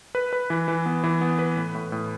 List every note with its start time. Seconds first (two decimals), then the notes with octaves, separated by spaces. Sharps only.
0.15 B4
0.33 B4
0.50 E3
0.68 E3
0.86 B3
1.04 E3
1.21 B3
1.39 B4
1.57 A2
1.75 A2
1.92 A2